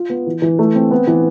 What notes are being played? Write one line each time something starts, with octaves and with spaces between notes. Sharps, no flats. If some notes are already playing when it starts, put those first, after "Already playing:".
Already playing: F4
B3
E3
E3
A3
C4
B3
E3